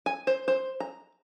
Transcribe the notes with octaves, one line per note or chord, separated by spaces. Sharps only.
G#5
C5
C5
A#5